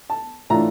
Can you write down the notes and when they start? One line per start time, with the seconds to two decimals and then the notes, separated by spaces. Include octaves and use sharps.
0.10 A5
0.50 A2 E3 A3 D4 F4 A#5